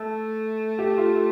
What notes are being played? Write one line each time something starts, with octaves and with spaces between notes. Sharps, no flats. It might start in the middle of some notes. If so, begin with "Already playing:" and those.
Already playing: A3 A4
G4
F4